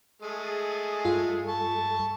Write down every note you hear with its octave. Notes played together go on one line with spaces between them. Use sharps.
G#3 A3 G#4 A5 D#6
G2 F4 A4
A5 C#6